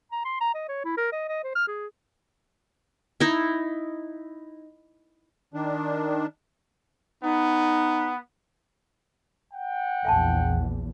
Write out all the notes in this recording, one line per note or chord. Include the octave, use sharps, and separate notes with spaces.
A#5
C6
A#5
D#5
C#5
E4
A#4
D#5
D#5
C5
F6
G#4
D#4 E4
D#3 D4
B3 D#4
F#5 G5
A#1 E2 E5 G#5 A5